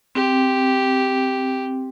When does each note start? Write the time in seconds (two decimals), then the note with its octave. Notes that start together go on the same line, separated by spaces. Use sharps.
0.15 C4 G4